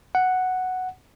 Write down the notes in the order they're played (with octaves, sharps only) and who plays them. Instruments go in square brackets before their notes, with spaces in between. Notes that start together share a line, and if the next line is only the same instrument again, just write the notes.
[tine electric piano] F#5